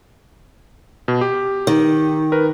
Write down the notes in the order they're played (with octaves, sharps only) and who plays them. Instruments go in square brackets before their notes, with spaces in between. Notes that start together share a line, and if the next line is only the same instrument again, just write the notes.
[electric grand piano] B2
G4
[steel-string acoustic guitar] D#3
[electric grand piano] A#4 B4